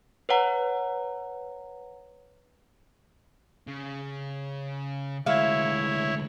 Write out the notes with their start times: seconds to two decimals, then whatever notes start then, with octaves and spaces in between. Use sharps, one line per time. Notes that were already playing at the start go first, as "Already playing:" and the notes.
0.29 B4 C#5 F#5 A#5
3.68 C#3
5.26 D2 G#3 E4 C#5 E5 F5